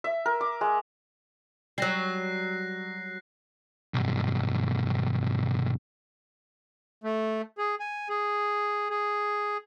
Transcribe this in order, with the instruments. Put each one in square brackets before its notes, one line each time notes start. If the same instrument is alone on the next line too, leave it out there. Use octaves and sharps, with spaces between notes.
[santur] E5
A#4
D6
G#3
[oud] F#3 G3 [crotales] F#6 A#6 C7
[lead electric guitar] B1 G2
[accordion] A3
G#4
G#5
G#4
G#4